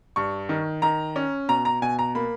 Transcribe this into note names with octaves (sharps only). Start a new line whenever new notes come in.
G2 C#6
D#3
D#3 A#5
C#4
B2 A#5
A#5
B2 G#5
A#5
A#3 B5